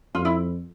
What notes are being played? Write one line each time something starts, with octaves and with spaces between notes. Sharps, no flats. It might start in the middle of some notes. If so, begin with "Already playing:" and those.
F2 F4
E4